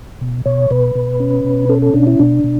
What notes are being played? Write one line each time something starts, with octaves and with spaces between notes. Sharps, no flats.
B2
B2 C#5
B2 B4
B2
C#4
B2
C#4 A4
A4
B2 D4
E4
B2 D4
B2